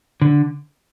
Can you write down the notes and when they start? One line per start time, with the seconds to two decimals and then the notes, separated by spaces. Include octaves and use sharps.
0.22 D3